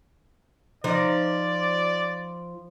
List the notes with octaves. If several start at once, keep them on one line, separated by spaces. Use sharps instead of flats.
F3 D#4 D5